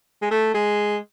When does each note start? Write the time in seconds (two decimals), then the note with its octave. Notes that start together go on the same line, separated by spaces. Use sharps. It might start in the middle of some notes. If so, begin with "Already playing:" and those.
0.22 G#3
0.31 A3
0.54 G#3